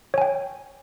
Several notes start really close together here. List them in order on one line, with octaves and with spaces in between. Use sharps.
C#5 G#5 G5